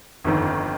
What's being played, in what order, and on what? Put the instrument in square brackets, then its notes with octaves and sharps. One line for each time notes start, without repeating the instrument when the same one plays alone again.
[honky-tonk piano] G1 F2 D#3